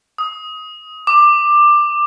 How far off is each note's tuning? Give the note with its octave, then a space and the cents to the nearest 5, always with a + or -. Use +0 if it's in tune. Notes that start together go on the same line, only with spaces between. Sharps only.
D#6 +20
D6 +15